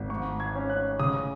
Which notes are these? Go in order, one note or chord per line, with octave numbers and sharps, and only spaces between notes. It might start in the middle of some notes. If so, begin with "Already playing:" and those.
Already playing: G#1
G#2 C#6
G#6
C#4
F#6
C#3 D#6